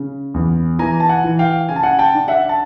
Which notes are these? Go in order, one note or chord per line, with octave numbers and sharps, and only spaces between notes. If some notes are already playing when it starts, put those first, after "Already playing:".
Already playing: C#3
E2
E3 G#5 A#5
A5
F#5 G#5
E3
F5 G5
C#3 G#5
A5
F#5 G#5
G5 A5
D4
E5 F#5
A5